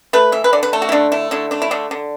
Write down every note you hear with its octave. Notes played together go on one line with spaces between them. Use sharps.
A3 B4
E3 E5
B4
D3 D5
B4
A3 A4
F#4
E4
D3 D4
A3 E4
D3 E4
A3 D4
E4
D3 D4
D3